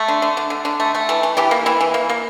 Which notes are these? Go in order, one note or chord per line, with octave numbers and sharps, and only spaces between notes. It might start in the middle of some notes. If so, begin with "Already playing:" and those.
Already playing: A3
D3
D3
D3
D3
D3
A3
A3
E3 A4
E3
E3 G4
A#3
E3 E4
E3
A#3
A#3